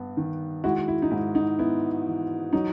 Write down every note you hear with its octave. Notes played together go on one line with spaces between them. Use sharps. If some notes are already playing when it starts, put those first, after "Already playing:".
Already playing: G2 B3
D#3
G#3 E4 F#4
E4
D#4
G#2 E4
D#4
B3 E4
E3
F#3 D#4